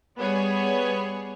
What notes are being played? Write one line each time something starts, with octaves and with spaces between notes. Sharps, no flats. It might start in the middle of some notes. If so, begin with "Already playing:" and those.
G3 B3 G#4 C#5